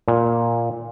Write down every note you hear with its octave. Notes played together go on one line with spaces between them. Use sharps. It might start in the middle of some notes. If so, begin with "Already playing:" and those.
A#2